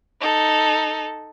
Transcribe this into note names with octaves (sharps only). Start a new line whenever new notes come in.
D#4 A4